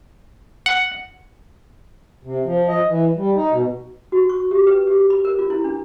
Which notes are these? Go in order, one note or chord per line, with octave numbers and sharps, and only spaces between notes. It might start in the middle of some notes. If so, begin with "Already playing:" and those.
F#5
C3
F3
D#5
E3
G3
D#4
B2
F#4
C#6
G4
B4
G4
B5
A#4
F4
E4
D4